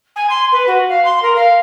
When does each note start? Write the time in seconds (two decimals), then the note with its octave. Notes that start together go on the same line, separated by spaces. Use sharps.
0.16 G#5
0.30 C6
0.52 B4
0.67 F#4
0.89 F5
1.05 C6
1.22 A#4
1.36 F5